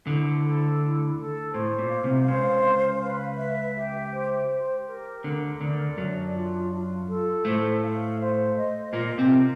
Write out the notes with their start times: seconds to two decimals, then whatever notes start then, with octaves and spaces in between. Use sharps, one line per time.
0.06 D2 D3 E4
0.43 A4
0.81 E4
1.18 A4
1.54 A2 C5
1.79 A#2
1.91 F5
2.03 C2 C3
2.28 C#2 C#3 C5
2.65 F5
3.02 B4
3.39 E5
3.76 G4
4.12 C5
4.50 G4
4.87 A#4
5.24 D2 D3 A#4
5.60 D2 D3 D5
5.97 F#2 F#3 D4
6.34 F4
6.72 F4
7.08 A4
7.45 A2 A3 C5
7.82 F5
8.20 C5
8.56 D#5
8.93 A#2 A#3 F4
9.18 C3 C4
9.30 A#4